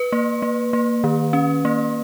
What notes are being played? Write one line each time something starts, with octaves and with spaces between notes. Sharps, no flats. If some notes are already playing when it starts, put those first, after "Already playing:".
Already playing: B4
A#3
A#3
A#3
D#3
C#4
A#3